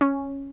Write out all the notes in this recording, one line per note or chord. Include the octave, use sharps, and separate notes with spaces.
C#4